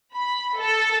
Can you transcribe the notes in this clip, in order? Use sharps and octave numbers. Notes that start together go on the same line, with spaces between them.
B5
A4